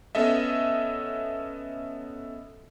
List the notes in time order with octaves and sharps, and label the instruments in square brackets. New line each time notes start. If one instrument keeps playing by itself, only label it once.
[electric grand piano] B3 C#4 A4 D#5 E5